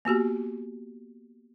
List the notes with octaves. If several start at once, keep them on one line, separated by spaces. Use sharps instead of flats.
A#3 B3 F#4 G4